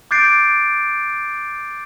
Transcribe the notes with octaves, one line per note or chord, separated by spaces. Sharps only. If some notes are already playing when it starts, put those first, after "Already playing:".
D6 F#6 G6 A6 C7 D7